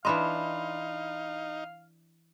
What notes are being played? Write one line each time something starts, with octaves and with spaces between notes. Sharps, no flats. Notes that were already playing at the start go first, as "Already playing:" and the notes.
E3 D4 D#4 D#5 F5 B5 C6